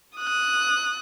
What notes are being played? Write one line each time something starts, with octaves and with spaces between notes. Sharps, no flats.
D#6 F#6